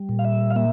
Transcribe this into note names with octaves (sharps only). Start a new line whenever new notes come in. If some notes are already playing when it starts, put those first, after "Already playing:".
Already playing: G3
A#2
F5
E5
F5
A#3 E5